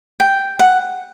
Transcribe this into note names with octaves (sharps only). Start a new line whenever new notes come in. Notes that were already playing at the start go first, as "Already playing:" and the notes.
G5
F#5